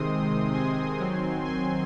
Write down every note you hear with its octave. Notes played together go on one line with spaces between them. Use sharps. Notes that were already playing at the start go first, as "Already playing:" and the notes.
Already playing: C3 D#3 G#3 C4 C6 D#6
G#5 C6
D#3 F#3 C4
G#5 C6